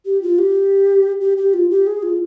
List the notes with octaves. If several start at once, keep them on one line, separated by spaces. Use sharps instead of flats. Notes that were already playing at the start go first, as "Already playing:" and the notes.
G4
F4
G4
G4
G4
F4
G4
G#4
F4